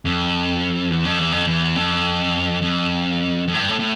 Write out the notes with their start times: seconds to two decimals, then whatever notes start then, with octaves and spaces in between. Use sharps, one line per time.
0.05 F2
0.90 E2
1.05 F2
1.19 E2
1.32 F2
1.47 E2
1.76 F2
2.62 F2
3.48 F2
3.54 A2
3.59 G2
3.69 A2
3.79 A2